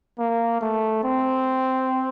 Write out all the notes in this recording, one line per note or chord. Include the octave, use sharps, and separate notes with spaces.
A#3
A3
C4